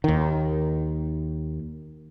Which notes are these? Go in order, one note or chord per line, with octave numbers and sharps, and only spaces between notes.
D#2 D#3